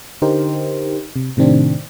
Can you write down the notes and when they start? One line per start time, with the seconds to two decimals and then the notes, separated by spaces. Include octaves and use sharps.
0.22 D3 D#4 G4 A#4 C5
1.16 C3
1.37 A2 C3 D#3 C4 D4